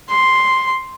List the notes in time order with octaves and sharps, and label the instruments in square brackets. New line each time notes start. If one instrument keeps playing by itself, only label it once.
[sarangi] C6